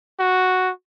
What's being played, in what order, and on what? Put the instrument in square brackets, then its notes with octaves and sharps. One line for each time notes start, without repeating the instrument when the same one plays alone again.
[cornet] F#4